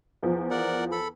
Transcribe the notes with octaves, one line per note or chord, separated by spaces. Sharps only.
E2 F3
A#4 D5 F#5
A4 B5